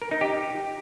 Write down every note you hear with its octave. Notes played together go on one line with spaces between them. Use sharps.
A#4
D#4
G4